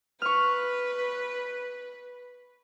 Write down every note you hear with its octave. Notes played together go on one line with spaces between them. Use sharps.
B4 C#6 F6